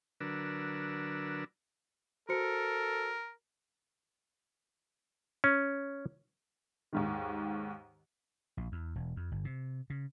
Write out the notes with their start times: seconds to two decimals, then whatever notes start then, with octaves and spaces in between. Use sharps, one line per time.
0.21 D3 F#3 D4 A#4 B4 E6
2.29 F#4 A4 A#4 C5 C#7
5.44 C#4
6.93 D#2 G#2 D#3
8.57 A#1
8.72 E2
8.95 E1
9.16 F2
9.32 G1
9.45 C3
9.90 C#3